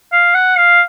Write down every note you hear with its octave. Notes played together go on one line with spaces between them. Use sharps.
F5
F#5
F5